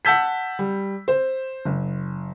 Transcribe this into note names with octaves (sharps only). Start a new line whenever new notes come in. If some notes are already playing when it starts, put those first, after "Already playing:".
F#5 A5 E6 G6 B6
G3
C5
F#1